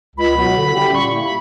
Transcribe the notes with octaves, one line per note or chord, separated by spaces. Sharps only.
C#2 B5
B2 F#3 B3 F#4
D3
G3 C#4 E4 G4
A#2 C#6
A#3 E4 G4
B5